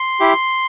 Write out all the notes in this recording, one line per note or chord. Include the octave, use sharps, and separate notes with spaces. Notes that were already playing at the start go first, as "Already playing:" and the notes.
Already playing: C6
E4 G4